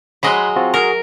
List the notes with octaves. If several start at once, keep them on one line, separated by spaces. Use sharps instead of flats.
F#3 G#3 D#5 B5 C6 F#6
C4 F4 F#4
F#4 G#4 A#4 C#6